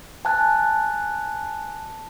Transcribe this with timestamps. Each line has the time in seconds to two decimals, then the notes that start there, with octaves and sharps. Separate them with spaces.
0.25 G#5 A5 F#6